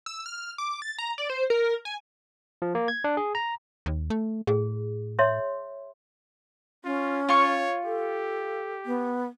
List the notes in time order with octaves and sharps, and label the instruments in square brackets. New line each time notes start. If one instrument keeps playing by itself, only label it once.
[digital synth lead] E6
F6
D6
A6
A#5
D5
C5
A#4
G#5
[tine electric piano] F3
A#3
G#6
D4
G#4
A#5
[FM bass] D#2
A3
[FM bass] A2 [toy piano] G#4
[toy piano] C#5 E5 C6
[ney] C#4 [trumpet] F4
[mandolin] F4 C#6 [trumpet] C#5
[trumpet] G4 [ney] A4
[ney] B3